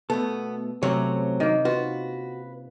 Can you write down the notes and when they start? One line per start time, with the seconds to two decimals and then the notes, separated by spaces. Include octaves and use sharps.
0.10 B2 A3 B3 A4
0.83 C3 F#3 A3 C4 C#4 C#5
1.40 D#3 A#3
1.65 F4 F#4 B4